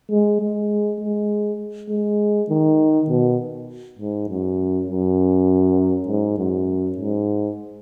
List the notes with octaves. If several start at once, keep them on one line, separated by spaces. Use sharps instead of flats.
G#3
G#3
G#3
G#3
D#3
B2
G#2
F#2
F#2
G#2
F#2
G#2